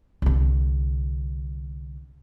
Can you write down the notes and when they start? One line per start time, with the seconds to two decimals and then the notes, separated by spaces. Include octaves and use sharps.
0.22 C2 D3